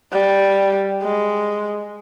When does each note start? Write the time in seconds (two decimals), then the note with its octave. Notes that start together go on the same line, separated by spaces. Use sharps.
0.12 G3
1.03 G#3